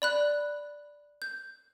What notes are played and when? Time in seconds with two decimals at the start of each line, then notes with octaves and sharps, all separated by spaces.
0.02 D5 B5 F#6
1.22 G6